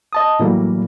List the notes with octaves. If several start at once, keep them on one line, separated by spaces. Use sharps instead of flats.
D#5 A5 D#6
A2 E3 F#3 G3 A#3